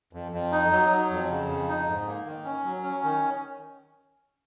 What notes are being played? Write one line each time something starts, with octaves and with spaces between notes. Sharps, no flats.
F2
F2
D#4
F#3
F#3
F2
C#3
F2
D#4
G#2
A#3
D#3
C#4
F#3
C#4
D#3